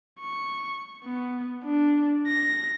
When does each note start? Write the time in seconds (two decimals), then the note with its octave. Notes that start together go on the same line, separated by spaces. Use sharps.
0.20 C#6
1.04 B3
1.65 D4
2.28 A#6